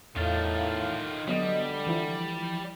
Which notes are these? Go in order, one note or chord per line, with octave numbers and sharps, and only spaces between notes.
E2 A2 D#3 F4 F5 A6
D3 F#3 G3 B3 D#5
E3 F3 E4